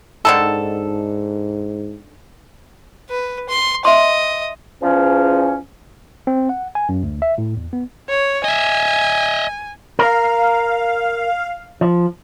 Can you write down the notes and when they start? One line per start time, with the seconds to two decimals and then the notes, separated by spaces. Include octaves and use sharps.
0.25 G#2 D3 D#3 A4
3.10 B4
3.49 C6
3.85 D#5 E5 C6
4.82 E2 F3 C#4
6.27 C4
6.49 F#5
6.75 G#5
6.89 F#2
7.03 D2
7.22 E5
7.38 A2
7.57 E2
7.73 B3
8.09 C#5
8.44 D#5 E5 G#5
9.99 A#4 F5
11.81 F3